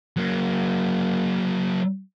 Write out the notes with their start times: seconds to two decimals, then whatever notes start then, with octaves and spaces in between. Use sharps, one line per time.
0.17 F#3 A#3